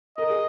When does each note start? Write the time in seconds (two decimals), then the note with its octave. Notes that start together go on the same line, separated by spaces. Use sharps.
0.18 A#4 D#5
0.30 G#4